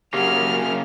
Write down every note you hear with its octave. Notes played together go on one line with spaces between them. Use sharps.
F#2 C#3 A#3 C#4 G4 F#5 F6